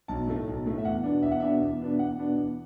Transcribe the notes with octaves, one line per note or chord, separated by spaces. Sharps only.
B1 A5
A2 A3
B1
A2 A3
E5
E2 F#5
B2 B3 D4
E2 E5
F#5
B2 B3 D4 E5
E2
B2 B3 D4
E2 F#5
B2 B3 D4
E2